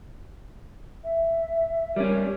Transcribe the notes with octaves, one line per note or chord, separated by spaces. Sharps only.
E5
G3 C#4 A#4